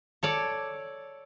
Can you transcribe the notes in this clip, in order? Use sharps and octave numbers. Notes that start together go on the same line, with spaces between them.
A4 C#5 D5